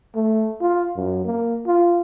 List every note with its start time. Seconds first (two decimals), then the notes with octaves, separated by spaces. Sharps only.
0.15 A3
0.61 F4
0.96 F#2
1.25 A#3
1.66 F4